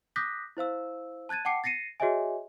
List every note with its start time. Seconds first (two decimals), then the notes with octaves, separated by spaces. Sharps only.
0.16 D6 D#6 F#6 G6 A#6 B6
0.57 E4 C5 F5 E6
1.29 A5 F#6 G#6 A6 D#7
1.45 F#5 G5 A5 D6 C7 C#7
1.64 A6 A#6 C7 C#7 D#7
2.00 F#4 G#4 C#5 D#5 E5 G#5